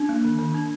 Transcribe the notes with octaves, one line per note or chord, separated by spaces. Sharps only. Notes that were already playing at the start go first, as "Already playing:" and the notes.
Already playing: D4
A#3
D#3
D#3
D4